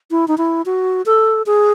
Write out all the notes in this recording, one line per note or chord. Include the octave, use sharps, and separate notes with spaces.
E4
D#4
E4
F#4
A4
G#4